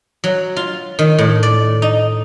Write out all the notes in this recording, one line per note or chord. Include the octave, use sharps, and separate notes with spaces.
F#3
F4
D#3
A2
D5
D#4